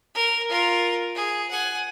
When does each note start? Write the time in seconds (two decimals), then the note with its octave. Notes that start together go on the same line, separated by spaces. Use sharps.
0.15 A#4
0.49 F4 A#4
1.15 G#4
1.50 F#5 G#5